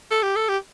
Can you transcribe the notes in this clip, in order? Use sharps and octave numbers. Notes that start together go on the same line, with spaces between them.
A4
G4
A4
G4